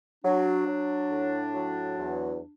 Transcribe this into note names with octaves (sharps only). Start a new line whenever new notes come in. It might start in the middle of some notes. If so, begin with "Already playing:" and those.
F#3 D4
F#3
A2
F#3
E2